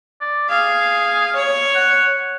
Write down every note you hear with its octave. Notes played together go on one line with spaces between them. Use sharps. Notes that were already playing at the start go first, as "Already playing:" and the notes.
D5
G#4 F5
C#5
F#5